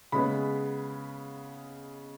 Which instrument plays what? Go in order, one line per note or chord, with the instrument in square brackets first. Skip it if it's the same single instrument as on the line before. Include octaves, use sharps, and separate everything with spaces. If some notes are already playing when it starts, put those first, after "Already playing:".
[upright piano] C#3 G#3 B3 B5